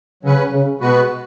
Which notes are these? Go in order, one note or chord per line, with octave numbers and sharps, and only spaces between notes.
C#3 F#3 C#4 B4
C#3
B2 G#3 B3 F#4 B4